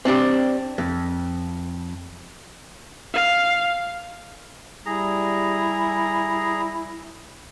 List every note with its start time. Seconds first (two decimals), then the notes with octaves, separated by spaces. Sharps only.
0.05 C4 D4 F#4 G4
0.78 F2
3.14 F5
4.86 G3 E4 G#4 A#5